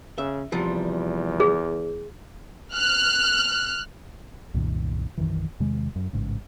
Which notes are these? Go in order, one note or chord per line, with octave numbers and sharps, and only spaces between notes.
C#3 E5
E2 C3 F3 G3
G#4
F6 F#6
C2 F#2 A#2 D#3
B1 F#2 D#3 E3
E2 C3 D#3 G#3
F#2
A1 G#2 C#3